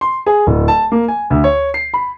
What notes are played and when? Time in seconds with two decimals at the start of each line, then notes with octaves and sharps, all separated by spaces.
0.01 C6
0.26 G#4
0.47 D1
0.68 A5
0.92 A#3
1.08 G#5
1.30 D2
1.44 C#5
1.74 C7
1.94 B5